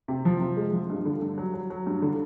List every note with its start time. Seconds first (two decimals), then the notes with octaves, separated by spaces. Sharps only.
0.08 C3
0.25 F3
0.40 C3
0.57 G#3
0.73 F3
0.90 G2
1.05 D3
1.22 G2
1.38 F#3
1.54 F#3
1.70 F#3
1.86 G2
2.02 D3